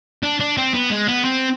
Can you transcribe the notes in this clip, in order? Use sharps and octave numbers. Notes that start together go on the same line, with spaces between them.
D4
D4
C4
B3
G#3
B3
C4